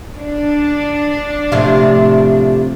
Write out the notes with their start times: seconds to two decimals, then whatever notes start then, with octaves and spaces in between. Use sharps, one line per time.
0.17 D4
1.52 A2 C3 F3